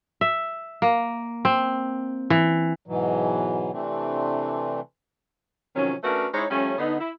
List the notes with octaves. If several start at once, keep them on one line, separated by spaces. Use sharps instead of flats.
E5
A#3
C4
E3
G#2 B2 E3 F#3
C3 E3 A3 C4 D4
C3 D#3 F3 F#3 C#4
A3 C#4 D4 F#4 A#4 B4
G#3 D#4 E4 C5 C#5
F3 G3 A3 C#4
D3 B3 D#4
E4